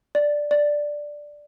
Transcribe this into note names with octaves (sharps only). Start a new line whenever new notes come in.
D5
D5